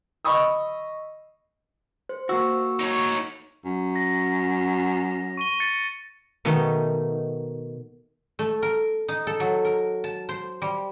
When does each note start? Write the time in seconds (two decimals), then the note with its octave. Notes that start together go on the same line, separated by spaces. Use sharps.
0.25 D#5 B5 C#6 D#6 E6
2.09 C5
2.29 A#3 F#4 C#6 E6
2.80 D#4 C#5
3.65 F#2
3.96 A#6
5.37 C#6 D#7 G7
5.60 A6 C#7
6.45 B2 D#3 A3 D#4
8.39 A3
8.62 A#4
9.08 D#4
9.27 A4
9.40 F#3
9.65 A#4
10.04 A5
10.29 C5
10.62 G3